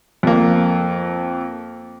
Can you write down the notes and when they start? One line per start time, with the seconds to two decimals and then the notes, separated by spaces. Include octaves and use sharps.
0.23 F2 A#3